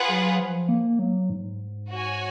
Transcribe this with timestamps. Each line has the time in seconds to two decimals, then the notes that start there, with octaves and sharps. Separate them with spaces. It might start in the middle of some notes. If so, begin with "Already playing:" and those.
Already playing: F4 G#4 B4 F#5
0.09 F#3
0.39 F3
0.69 A#3
0.99 F#3
1.30 G#2
1.90 F#4 C#5 G#5